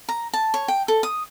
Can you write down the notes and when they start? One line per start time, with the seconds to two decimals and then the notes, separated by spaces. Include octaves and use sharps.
0.09 A#5
0.34 A5
0.54 C#5
0.68 G5
0.88 A4
1.03 D#6